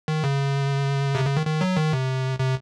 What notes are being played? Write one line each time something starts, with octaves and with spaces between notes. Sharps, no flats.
D#3
C#3
C3
C#3
D#3
D#3
F#3
D#3
C3
C3